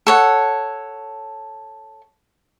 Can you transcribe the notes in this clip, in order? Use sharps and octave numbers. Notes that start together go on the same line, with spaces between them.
A4 C#5 F#5